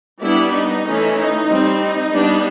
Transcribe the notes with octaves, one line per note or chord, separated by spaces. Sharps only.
G3 B3 D4 E4
D#4
E3 A3 C#4
D#4
G3 C4
D#4
G3 B3 D4